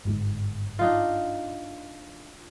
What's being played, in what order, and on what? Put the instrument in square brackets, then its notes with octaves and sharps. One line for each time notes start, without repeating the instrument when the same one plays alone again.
[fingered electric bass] G1 G#2 G#3
[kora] D4 D#4 F4